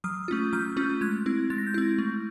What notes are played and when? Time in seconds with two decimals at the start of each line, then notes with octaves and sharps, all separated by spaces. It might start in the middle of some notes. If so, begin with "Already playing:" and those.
0.04 F#3 D#6 F6
0.28 A3 C#4 F4
0.53 F#3 F6 G6
0.77 A3 C#4 F4
1.01 G#3 F#6 G#6
1.26 C4 E4
1.50 G#3 A6
1.58 A#6
1.66 G6 A6
1.74 C4 E4
1.99 A3